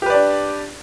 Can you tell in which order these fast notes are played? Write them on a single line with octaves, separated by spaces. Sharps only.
G4 B4 D5 D4